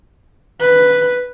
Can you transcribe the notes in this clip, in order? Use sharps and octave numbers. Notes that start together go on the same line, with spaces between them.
B4